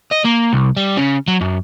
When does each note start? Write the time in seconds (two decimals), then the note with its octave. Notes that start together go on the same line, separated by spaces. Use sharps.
0.11 D#5
0.24 A#3
0.53 C2
0.77 G3
0.97 C#3
1.28 F#3
1.41 F#2